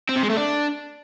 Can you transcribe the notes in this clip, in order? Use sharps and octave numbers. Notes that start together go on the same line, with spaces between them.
C4
C3
G#3
A3
D4